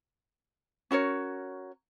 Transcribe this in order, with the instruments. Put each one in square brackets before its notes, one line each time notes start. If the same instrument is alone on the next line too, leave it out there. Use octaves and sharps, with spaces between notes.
[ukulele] C#4 F#4 A#4 C#5